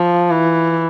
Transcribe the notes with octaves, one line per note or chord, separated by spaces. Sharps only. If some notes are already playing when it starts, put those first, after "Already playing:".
Already playing: F3
E3